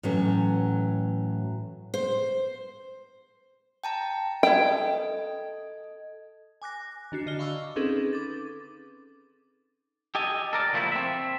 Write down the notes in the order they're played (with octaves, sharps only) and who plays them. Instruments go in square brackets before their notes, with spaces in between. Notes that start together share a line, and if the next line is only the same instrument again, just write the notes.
[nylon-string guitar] A2 E3 F#3 C#4
[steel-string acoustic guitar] C5
[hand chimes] G5 A5 A#5
[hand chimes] A4 D#5 G#6 [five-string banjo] G5
[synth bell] G#5 D6 F#6 A#6
D#3 D4 F#4 C7
D3 D#5 F6 G7
F5 B5 C#6 D6 E6
C4 C#4 D#4 G#4 A4 B4
D6 A6
[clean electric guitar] G4 A4 D#5 G#5
A4 A#4 D5
D3 F3 A3 A#3 E4
C4 E5